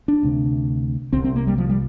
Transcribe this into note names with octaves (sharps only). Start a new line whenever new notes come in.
D4
D2 C3
C2 C3 C4
C4
A#3
G3
F3
G3